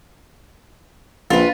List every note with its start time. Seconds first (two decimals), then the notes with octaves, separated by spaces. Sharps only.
1.30 A#1 F4 B4